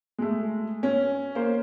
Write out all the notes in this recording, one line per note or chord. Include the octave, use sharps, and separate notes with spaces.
G#3 A3
C#4
A#3 C5